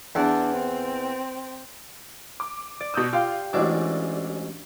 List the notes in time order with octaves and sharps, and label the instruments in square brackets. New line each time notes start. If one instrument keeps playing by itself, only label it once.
[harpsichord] E2 [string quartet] D4
[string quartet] C4
[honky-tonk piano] D6
[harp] D5
[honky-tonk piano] B2 D#6 [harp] E6 G6
[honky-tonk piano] F4 [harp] G4 F5 G6
[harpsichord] A1 G#2 F#3 [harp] D4 [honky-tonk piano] D5